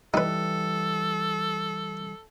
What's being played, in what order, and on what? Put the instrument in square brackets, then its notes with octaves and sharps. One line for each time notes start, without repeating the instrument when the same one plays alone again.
[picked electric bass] E3 G3 [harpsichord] D#4 B4 [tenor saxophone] A4